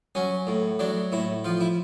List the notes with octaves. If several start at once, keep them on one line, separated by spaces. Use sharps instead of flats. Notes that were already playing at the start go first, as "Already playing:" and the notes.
F#3 C#4
A2
F#3 D4
A2 E4
F3 F4
E4